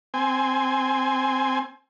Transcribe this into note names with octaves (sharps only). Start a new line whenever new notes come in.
C4 G#5